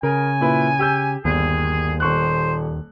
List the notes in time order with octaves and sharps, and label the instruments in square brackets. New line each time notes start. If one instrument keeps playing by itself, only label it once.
[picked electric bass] C#3 [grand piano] A#4 [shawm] G#5
[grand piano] A#2 E4 B4
G4 E6 G6
[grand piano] G1 [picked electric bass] D#2 [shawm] G#4
[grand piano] D#1 C#6 F#6 [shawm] C5